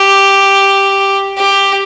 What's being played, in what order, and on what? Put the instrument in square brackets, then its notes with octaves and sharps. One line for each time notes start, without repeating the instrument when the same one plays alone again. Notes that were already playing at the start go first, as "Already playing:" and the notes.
Already playing: [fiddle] G4
G4